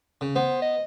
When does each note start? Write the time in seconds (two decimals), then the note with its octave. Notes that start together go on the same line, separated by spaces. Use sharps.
0.21 C#3
0.36 B3 C5
0.62 D#5